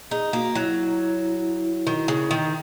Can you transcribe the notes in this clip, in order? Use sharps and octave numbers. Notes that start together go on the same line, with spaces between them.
D#4 G#4
A#3 F#4
F#3 E4
D#3
C#3
D#3